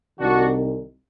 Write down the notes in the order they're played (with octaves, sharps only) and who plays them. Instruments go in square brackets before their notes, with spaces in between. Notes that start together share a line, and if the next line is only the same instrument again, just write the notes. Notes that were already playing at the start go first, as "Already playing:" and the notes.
[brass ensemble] C2 C3 D#3 D4 F#4